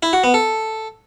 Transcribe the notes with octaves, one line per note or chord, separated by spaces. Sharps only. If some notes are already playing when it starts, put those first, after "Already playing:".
E4
F#4
B3
A4